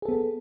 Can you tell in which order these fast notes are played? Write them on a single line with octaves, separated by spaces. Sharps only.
G#4 A4 B3